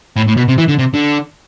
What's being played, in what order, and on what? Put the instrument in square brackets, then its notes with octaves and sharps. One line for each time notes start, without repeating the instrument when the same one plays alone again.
[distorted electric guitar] A2
A2
B2
C3
E3
D3
C3
D3